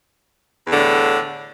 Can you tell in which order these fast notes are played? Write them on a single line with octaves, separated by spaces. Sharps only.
E2 D3 A2